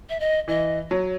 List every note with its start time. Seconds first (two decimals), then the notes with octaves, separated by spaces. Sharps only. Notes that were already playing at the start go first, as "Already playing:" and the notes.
0.10 E5
0.20 D#5
0.48 E3 D#5
0.90 F#3 C#5